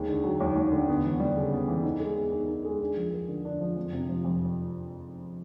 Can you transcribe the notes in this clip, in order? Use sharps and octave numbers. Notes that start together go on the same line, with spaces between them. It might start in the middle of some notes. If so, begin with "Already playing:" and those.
Already playing: D#2 G#3
D3
F#3
D#2
D#2
D3
B3
E3
G3
C#3
B3
E3
D#4
G#3
B3
D#3
D#4
G#3
D4
F3
A#3
D3
D4
F3
F2
C3
F3
F2